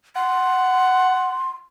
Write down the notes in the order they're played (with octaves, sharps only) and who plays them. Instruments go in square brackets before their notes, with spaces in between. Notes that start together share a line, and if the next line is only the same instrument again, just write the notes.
[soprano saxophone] F#5 [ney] C6